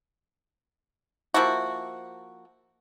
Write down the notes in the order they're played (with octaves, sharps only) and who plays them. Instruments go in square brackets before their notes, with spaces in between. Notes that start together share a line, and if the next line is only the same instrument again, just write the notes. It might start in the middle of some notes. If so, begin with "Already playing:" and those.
[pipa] F3 A#3 E4 F#4